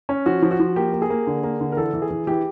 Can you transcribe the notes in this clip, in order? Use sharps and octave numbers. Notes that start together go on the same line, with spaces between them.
C#4
F3 F#4
F3
F#4
F3
A#3 G4
A#3
G#4
A#3
D3
A#3
D3
A#4
E3 A4
E3
G#4
E3
E3 G4